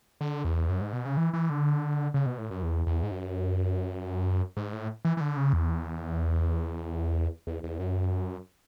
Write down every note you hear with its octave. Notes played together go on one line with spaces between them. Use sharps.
D3
E2
F#2
G#2
B2
C#3
E3
E3
D3
C#3
B2
A2
F#2
E2
E2
G#2
F#2
G#2
A2
E3
E3
D3
C#3
E2
E2
E2
F#2